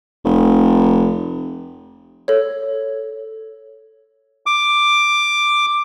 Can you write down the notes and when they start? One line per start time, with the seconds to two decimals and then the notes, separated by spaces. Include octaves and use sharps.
0.25 F1
2.28 A4 C#5
4.46 D6